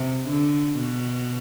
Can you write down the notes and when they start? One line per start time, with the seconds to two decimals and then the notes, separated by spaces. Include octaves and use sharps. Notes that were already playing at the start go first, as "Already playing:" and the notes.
Already playing: C3
0.29 D3
0.77 B2